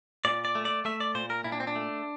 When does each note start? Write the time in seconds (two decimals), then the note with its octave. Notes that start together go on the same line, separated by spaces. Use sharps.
0.25 A#2 D5
0.45 D5
0.55 A3
0.65 D5
0.85 A3 E5
1.00 D5
1.15 A#2 C5
1.30 A#4
1.44 A#2 E4
1.52 D4
1.60 C4
1.67 D4
1.75 A3